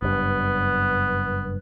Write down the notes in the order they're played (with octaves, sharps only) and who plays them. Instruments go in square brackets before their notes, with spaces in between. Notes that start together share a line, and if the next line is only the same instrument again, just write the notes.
[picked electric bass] F#1 G2 [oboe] B3